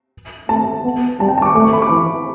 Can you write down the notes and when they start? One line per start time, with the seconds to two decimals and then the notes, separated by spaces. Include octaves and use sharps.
0.49 A3 A5
0.84 B3
1.20 G3 A5
1.29 G5
1.38 A5
1.42 D6
1.45 C#6
1.55 A3 D6
1.64 C#6
1.73 B5
1.78 C#6
1.82 D6
1.90 E3